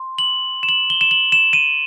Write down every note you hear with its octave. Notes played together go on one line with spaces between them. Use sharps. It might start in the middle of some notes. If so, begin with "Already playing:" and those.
Already playing: C6
F#7
E7
F#7
G7
E7
F#7
E7
D#7